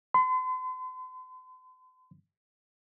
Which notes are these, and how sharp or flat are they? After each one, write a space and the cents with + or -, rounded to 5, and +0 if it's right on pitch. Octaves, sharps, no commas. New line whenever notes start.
C6 -45